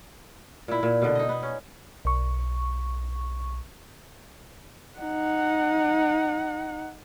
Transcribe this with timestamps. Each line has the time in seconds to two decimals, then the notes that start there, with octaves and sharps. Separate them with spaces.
0.68 A#2 E4
0.83 A#2
1.02 B2 D3
1.15 D#4 D#5
1.29 B3
1.43 C#4
2.05 B1 C#6
4.98 D#4 F#5